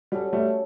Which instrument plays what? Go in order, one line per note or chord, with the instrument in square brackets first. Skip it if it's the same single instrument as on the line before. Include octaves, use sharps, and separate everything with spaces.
[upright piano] G3 [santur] C#4 F#4 A4 D5
[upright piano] G3 A3